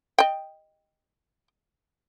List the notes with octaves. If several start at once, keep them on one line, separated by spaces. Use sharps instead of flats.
D#5 G5